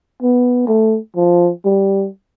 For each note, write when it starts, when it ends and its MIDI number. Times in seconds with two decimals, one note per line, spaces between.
0.22 0.66 59
0.68 0.97 57
1.17 1.50 53
1.65 2.07 55